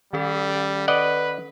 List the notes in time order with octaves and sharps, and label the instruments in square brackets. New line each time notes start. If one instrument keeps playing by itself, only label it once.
[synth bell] D#3 C#4 A4 [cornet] G3
[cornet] B4 [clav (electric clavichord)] D5 D#5 F#5